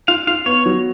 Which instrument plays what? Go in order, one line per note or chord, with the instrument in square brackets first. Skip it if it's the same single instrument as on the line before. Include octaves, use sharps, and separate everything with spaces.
[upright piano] F4 [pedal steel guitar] F5
[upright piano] F4 [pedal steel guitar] F5
[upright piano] B3 [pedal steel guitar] C#5
[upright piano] F#3